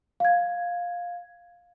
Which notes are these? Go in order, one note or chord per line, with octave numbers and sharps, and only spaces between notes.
F5 G#6